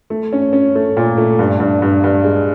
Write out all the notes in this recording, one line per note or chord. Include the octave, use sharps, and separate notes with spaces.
A3
C#4
C#4
A3
A#2
A3
G2
G2
G2
G2
G#3